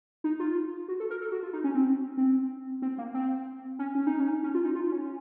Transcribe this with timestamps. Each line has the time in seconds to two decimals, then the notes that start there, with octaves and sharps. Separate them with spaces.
0.24 D#4
0.40 F4
0.88 F#4
1.00 A4
1.10 A#4
1.21 A4
1.32 F#4
1.43 F4
1.53 D#4
1.64 C#4
1.75 C4
2.17 C4
2.82 C4
2.98 A#3
3.14 C4
3.79 C#4
3.95 C#4
4.07 D#4
4.20 C#4
4.44 C#4
4.55 F4
4.64 D#4
4.75 F4
4.92 C#4